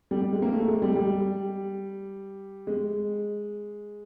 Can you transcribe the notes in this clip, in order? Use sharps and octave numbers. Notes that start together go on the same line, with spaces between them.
G3
G3
G#3
A#3
A3
G#3
G3
G3
G#3